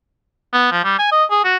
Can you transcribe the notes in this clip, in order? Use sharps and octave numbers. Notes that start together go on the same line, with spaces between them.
B3
F3
G3
G#5
D#5
G#4
F#4